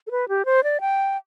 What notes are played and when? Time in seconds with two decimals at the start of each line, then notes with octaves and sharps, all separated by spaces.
0.07 A4
0.11 B4
0.29 G4
0.45 C5
0.64 D5
0.81 G5